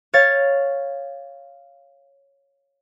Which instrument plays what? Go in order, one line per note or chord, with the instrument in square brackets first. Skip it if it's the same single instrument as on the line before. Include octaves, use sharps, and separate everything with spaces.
[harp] C#5 F5 A6